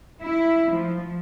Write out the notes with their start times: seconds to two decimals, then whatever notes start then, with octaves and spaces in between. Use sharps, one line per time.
0.22 E4
0.73 F3